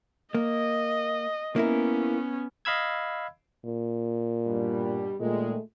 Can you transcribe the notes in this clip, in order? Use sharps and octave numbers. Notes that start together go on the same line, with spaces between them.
A#3 D#5
A#3 B3 C#4 E4 A#4
D#5 F5 B5 E6 G#6
A#2
G2 B2 G3
A#2 D#3 G#3 A3